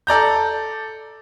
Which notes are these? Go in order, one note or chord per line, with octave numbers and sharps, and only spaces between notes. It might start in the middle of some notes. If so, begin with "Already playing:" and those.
A4 D5 A#5 G6